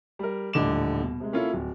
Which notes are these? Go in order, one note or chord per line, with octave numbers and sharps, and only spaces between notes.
G3 A#4
D#1 A2 D3 D#5 D6 E7
B2
C3 G#3
A#3 C#4 E4 F4 A4 C#5
D1